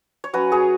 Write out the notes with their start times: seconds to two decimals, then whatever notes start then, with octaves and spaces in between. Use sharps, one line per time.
0.24 C#5
0.33 F#3 C#4 F#4 B4
0.52 G#4 C#5